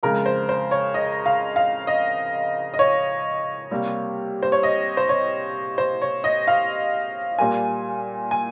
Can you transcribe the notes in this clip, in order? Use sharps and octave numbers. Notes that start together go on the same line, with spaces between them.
F2 C#3 G#3 A#4
C5
C5
C#5
D#5
F5
F5
D#5
D#5
C#5
C3 G3 A#3
C5
C#5
D#5
C5
C#5
C5
C#5
D#5
F5
A#2 G3 A#3 G#5
G#5